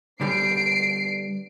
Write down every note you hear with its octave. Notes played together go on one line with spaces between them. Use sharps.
D3 G3 B3 C7 D7